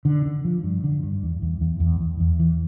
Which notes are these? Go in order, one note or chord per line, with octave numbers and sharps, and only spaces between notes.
D3
D3
F3
G2
D3
G2
E2
E2
E2
E2
E2
E2
E3